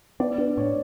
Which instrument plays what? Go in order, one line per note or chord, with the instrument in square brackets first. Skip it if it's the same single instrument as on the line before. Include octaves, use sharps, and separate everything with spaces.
[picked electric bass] B3 [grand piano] D5
[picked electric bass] D4
[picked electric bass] A2 [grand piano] C#5